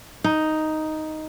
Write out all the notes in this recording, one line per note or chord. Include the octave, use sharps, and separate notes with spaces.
D#4